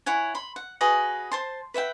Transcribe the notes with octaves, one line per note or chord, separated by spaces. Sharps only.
E4 C#5 F#5 G#5
B5 C6
F#5
F#4 G#4 B4 D#5
C5 A5 C6
B4 E5 F#5 G5